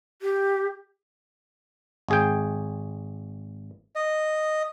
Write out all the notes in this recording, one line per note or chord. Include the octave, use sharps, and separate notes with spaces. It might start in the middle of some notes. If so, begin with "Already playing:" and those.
G4
G#1 G#4 G5
D#5